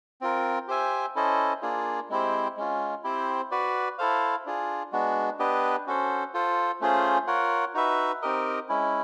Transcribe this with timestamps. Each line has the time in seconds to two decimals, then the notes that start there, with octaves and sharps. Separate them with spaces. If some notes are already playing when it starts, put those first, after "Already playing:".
0.21 C4 F4 A#4
0.68 G4 C5 E5 G#5
1.15 C#4 E4 A4 C5 D#5
1.62 A#3 D4 F4 G#4
2.09 G#3 C4 E4 G4 C5
2.57 G#3 C#4 F4
3.04 C4 E4 G4 C5
3.51 F#4 B4 D5
3.98 E4 A4 C5 F5
4.46 D4 F4 G#4
4.92 G#3 B3 D4 F#4
5.39 B3 D4 G4 B4 D#5
5.87 C#4 F#4 A4 C5
6.34 F4 A4 C5
6.81 A3 C#4 F4 G#4 C5
7.27 F4 A#4 C#5 F#5
7.74 D#4 F#4 B4 E5
8.22 C4 D#4 G4 A#4 D#5
8.69 G#3 C#4 E4